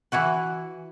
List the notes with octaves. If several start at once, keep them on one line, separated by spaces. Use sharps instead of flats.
E3 E4 F#4 B4